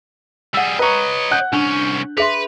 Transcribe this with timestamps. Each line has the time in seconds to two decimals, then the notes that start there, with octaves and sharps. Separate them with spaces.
0.54 G3 G#4 F#5 E6
0.79 B4 C#5 D#5 A#5 C#6
1.31 F#5 F#6 G6
1.53 C2 C#4 D4
2.18 G#4 B4 E5 C6 F7